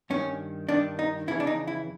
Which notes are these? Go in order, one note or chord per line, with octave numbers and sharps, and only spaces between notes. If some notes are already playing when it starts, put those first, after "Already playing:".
G2 D#3 C#4
G2 D#3 D4
D#4
F2 C#3 E3 E4
D4
D#4
E4